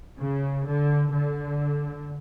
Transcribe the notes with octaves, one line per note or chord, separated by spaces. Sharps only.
C#3
D3
D3